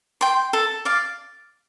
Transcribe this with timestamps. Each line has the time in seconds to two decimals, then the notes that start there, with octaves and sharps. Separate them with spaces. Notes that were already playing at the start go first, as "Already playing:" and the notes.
0.21 G5 C6
0.53 A4
0.85 D5 F5